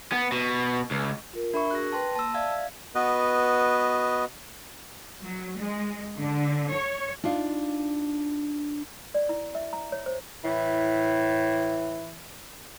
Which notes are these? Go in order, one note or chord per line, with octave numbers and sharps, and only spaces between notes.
B3
B2
C#2
F4 A#4
D4 A#4 E5 B5 C#6
F#4 G#4 F#6 A#6
B4 G5 A5 C6 A#6
A#3 A5 E6
D5 E5 F5 G#6
B3 F#4 B4 D#5
F#3
G#3
D3
C#5
D4 D#4 F4 F5
D5
E4
E5
A#5
C#5
C5
A2 E3